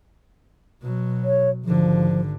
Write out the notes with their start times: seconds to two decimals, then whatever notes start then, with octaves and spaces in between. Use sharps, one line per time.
0.81 B2 F#3
1.23 C#5
1.64 G#1 D3 F3